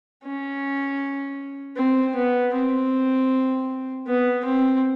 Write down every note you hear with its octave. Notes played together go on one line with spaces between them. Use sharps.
C#4
C4
B3
C4
B3
C4